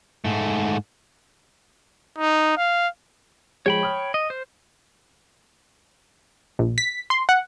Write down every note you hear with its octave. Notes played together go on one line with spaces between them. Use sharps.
G#2 A3
D#4
F5
F3 G#3 C#5 G5 B5
D#6 F6
D#5
C5
A#1
B6
C6
F#5